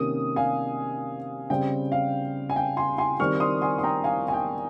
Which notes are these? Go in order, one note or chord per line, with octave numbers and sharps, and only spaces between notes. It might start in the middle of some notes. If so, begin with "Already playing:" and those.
Already playing: C3 D#3 A#3 C#4 D#6
F5 G#5
C#3 G3 C4 G5
F5
G#5
G5
G#5 C6
G#5 C6
D#3 G3 C4 C#6 F6
C6 D#6
G#5 C6
C6
G5 A#5
F5 G#5
G#5
G5